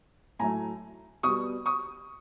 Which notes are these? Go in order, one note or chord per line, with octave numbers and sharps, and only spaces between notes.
A2 F#3 A3 G#5 A#5
B2 G3 C#6 D#6
C#6 D#6